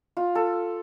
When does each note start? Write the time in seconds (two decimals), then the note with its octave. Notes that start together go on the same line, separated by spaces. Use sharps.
0.17 F4
0.35 A4